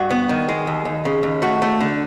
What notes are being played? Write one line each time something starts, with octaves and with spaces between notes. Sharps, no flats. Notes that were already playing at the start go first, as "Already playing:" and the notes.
Already playing: G2 F#4
B3
D#3
G#3
D#2
D#2
C#3
D#2
A3 F#4
A3
D3